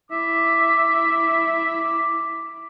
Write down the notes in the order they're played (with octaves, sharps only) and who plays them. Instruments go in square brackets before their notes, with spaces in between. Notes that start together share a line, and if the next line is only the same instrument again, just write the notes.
[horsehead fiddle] E4 [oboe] E5 [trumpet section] D6